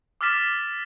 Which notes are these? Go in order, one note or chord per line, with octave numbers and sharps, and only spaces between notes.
D6 E6 F6 A6 B6 E7